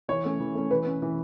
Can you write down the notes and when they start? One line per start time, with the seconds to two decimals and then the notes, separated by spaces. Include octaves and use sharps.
0.08 E3 C#5
0.25 A3 C#4
0.40 E3
0.55 A3 C#4
0.70 E3 B4
0.86 C#4
1.02 E3